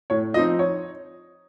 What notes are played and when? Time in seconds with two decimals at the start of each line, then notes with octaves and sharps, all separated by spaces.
0.10 A2 C#5
0.34 F3 C4 D#4 D#5
0.59 C#5